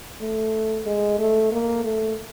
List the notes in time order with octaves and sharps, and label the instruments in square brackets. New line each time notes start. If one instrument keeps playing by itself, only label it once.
[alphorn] A3
G#3
A3
A#3
A3